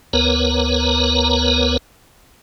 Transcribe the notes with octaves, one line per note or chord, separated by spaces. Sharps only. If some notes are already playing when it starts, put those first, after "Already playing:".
D2 B3 A#4 B4 C#5 A#5